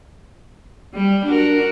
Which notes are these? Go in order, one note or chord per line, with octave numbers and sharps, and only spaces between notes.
G3
D4 F#4 A#4